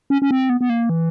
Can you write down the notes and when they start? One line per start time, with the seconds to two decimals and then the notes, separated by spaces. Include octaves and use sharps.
0.10 C#4
0.22 C#4
0.31 C4
0.50 B3
0.61 B3
0.70 A#3
0.89 E3